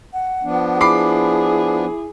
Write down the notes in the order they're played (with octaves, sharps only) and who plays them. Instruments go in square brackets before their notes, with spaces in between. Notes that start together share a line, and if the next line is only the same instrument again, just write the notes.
[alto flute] F#5
[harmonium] F3 B3 D4
[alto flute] E4 [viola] G#4 [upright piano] B5 D6 C7